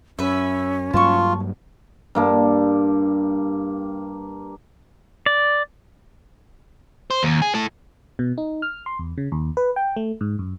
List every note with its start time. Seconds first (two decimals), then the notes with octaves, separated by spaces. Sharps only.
0.19 F#2 C#4 B4 E5
0.93 G2 F#3 A#3 F4 A5 C#6
2.15 G2 A#3 A5
5.26 D5
7.11 C5
7.23 D#2
7.42 G#4
7.54 E4 A4
8.19 B2
8.38 D#4
8.62 F6
8.86 C6
8.99 E2
9.18 C#3
9.32 D#2
9.57 B4
9.76 G5
9.96 A3
10.21 G#2
10.39 F#2